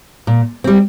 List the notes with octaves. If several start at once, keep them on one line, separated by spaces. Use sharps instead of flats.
A#2
G3 C4